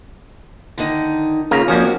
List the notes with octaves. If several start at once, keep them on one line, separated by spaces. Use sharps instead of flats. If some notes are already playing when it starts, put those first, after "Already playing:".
D3 D#3 D#4
C#3 A#3 F4 A#5
F2 F3 A#3 C#4 D4 F#4